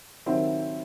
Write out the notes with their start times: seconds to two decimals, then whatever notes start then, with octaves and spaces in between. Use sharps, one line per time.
0.26 D#3 F#3 C4 E5